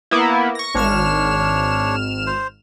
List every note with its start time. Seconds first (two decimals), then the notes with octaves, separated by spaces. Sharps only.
0.11 A#3 B3 E4
0.55 C#6 A#6
0.75 G#1 D4 C#5 F6 E7
2.27 C5